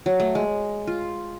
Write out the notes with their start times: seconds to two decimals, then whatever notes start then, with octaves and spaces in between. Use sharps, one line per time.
0.06 F#3
0.20 A3
0.35 G#3
0.87 F4